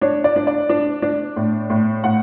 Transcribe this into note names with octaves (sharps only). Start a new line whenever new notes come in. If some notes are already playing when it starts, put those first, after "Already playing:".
D4 C#5
D5
D4
D5
D4
D4
A2
A2
A2 F#5